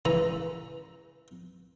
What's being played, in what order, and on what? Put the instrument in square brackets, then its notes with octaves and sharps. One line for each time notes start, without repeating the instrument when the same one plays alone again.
[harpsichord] C#2 E3 A#5